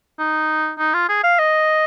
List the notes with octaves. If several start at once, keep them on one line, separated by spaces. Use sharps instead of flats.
D#4
D#4
F4
G#4
F5
D#5